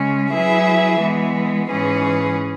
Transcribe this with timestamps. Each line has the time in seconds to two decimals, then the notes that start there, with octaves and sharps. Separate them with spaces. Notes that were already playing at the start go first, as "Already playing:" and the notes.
Already playing: C#3 G#3 C#4
0.32 F#3 E4 G#4 B4 E5
0.99 E3 G#3 B3
1.67 G#2 E3 C#4 G#4 B4